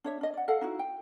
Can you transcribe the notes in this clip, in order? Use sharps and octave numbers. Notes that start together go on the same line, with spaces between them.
D4 C#5 E5
D4 D#5
D5 F#5
A4 D#5 F5 F#5
D#4 E4 F#4
G5